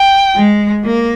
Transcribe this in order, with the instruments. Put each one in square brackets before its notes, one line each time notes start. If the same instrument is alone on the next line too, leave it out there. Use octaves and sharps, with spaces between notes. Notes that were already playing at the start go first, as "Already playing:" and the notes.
Already playing: [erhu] G5
[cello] G#3
A#3